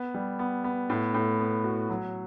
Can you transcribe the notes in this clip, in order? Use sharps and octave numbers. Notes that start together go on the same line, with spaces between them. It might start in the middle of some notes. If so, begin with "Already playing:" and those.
Already playing: B3
G3
B3
B3
A2
A2
B3
F#4
F#3